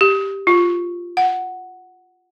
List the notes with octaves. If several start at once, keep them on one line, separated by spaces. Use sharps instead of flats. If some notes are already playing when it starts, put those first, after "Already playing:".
G4
F4
F#5